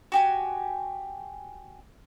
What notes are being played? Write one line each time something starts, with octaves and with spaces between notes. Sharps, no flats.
F#4 G4 G#5